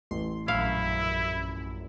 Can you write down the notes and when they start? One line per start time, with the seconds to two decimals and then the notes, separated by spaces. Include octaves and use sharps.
0.11 A1 C6
0.48 A#1 F#2 E4 F5